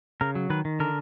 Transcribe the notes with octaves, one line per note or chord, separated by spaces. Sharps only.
C#3 A#4
F#3
D#3 B4
D#3
D3 A#4